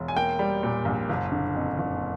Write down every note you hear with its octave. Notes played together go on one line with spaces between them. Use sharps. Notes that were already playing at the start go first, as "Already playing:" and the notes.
Already playing: E1
G#5
A#3 G5
G3
A#2
A#1
F#1
D3
F2
F#1